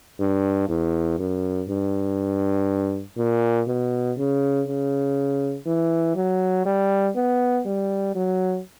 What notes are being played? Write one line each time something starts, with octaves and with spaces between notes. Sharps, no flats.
G2
E2
F#2
G2
A#2
B2
C#3
C#3
E3
F#3
G3
B3
G3
F#3